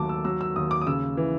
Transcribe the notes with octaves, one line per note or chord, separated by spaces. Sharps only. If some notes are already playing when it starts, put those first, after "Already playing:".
Already playing: D#2 F#3 A3 A5 D6
E6
F#3 E6
E6
D#2 D#6
D6
D#6
C#3 E6
E3